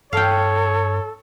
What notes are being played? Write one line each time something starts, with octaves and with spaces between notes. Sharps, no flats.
G2 A4 C#5 F5 G5